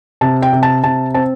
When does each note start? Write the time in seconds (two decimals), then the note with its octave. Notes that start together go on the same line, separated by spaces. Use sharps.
0.21 C3 A5
0.42 G5
0.53 C3
0.63 A5
0.84 C3 A5
1.14 C4 A5